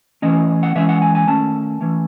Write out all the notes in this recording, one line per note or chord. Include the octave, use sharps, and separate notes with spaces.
E3 A3 C#4 D#5
F#5
E3 G#3 C#4 E5
F#5
G#5
G#5
D#3 A3 C#4 A5
E3 A3 C#4